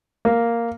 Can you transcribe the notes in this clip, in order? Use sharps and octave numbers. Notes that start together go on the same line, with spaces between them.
A#3